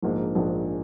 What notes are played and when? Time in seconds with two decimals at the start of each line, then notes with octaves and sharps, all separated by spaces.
0.03 A#1 G#2 F3 A#3 D4
0.35 A#1 G#2 F3 A#3 D4